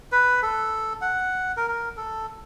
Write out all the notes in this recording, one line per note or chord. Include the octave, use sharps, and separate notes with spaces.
B4
A4
F#5
A#4
A#4
A4